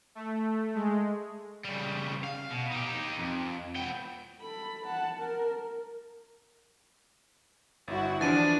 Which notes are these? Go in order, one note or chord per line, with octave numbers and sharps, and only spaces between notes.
A3
G#3
C#3 G3
F5
B2
D#4 G4
F2
B3 G5
A4 B5
F#5 A5
A#4
G1 E4 F#4
E3 F3 D4 A6 D#7